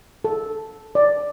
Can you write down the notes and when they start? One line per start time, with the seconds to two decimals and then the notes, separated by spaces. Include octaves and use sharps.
0.24 A4
0.95 D5